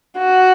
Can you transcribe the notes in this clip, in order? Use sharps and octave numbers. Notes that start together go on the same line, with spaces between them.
F#4